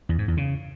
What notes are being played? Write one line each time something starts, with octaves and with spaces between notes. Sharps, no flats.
E2
G#2
E2
C#3